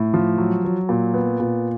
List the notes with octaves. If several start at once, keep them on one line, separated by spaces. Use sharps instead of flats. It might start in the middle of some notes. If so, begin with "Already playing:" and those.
Already playing: A2
F3
F#3
F#3
A#2
B3
A#2